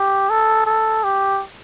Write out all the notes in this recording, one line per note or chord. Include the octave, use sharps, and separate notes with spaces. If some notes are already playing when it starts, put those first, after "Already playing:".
Already playing: G4
A4
A4
G4